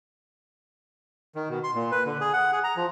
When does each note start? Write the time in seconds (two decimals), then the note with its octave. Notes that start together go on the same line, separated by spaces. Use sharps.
1.35 D#3
1.49 B2
1.64 C6
1.75 A#2
1.91 B4
2.06 D3
2.21 G#4
2.33 F#5
2.52 G#4
2.64 A#5
2.76 F3